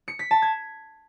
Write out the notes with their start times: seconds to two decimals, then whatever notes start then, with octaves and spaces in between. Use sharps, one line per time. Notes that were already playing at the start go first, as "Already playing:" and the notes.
0.08 C#7
0.19 B6
0.31 A5
0.42 G#6